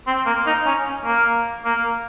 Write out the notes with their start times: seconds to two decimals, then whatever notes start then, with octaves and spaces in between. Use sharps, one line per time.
0.07 C4
0.26 A#3
0.46 D#4
0.66 C#4
1.05 A#3
1.65 A#3